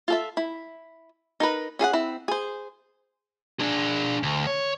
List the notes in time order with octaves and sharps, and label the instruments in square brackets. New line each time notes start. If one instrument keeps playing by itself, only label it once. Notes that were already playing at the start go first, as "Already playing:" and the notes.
[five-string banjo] F4 A4 E5
E4
D#4 A#4 B4
C#4 G#4 F5 F#5
C4 E4
G#4 C5
[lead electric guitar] D4 G#4
D2
C#5